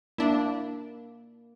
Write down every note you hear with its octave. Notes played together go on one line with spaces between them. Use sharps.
A#3 D4 E4